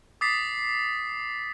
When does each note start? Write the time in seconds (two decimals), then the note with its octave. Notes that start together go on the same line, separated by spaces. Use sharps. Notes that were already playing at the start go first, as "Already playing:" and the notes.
0.21 D6 D#6 A6 B6 C7